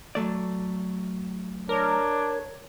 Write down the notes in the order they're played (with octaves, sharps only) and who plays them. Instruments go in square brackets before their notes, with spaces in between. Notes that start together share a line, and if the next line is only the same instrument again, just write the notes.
[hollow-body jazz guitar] F#3 A3 D5
[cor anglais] D4 [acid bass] A#4 [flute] C#5